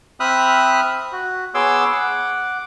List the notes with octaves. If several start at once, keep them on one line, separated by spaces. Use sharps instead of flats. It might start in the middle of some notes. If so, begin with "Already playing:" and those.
C4 E5 B5 D#6 F6 F#6
F#4
B3 G#4 C#5 C6 D6 E6
F#5 D6